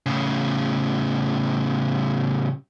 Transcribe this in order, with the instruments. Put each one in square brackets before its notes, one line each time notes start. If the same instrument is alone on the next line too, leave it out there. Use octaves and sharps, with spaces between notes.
[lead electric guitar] A2 C#3